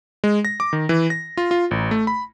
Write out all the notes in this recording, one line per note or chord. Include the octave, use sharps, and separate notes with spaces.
G#3
A#6
D6
D#3
E3
A#6
F4
F4
A1
A3
B5